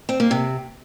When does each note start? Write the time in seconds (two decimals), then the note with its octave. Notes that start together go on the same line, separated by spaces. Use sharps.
0.09 C4
0.20 A#3
0.31 C3